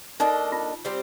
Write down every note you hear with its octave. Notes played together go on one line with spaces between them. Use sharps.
A#3 D4 D#4 A4 D#5
F4
G3 C4 G4 C5